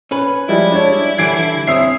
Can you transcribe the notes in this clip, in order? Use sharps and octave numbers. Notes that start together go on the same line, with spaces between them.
C#4 B4
F3 G3 G#3 E4
D4 C#5
D3 E3 G3 G#6 C7 D7
C4 C#5 E5 D#6 E6 C7